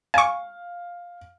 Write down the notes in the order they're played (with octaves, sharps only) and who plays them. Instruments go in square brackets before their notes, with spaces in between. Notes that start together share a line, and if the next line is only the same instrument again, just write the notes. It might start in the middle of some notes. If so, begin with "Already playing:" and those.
[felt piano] F5 [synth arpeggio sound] G#5 C#6